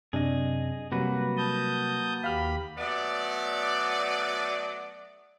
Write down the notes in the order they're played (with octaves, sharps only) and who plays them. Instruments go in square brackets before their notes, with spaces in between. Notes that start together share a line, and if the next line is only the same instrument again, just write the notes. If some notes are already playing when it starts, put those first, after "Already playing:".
[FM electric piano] F#2 C3 D4 [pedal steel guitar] G#4 D#5
[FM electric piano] C3 F#3 G3 [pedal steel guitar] A#3 F#4 B4
[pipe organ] A5 D#6 G6
[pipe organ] D#2 G4 B5 [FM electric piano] F5 F6
[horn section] F#3 A3 B3 D5